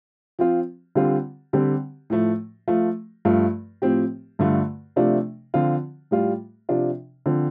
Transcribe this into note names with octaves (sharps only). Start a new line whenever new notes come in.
F3 C4 F4
D3 G3 C4 F4
D3 G3 C4 G4
A2 F3 A3
F3 A3 F4
G2 F3 A3 F4
A2 F3 C4 G4
G2 D3 A3 F4
C3 F3 A3 D4 F4
D3 F3 C4 F4
A2 G3 F4
C3 F3 D4 F4
D3 F3 C4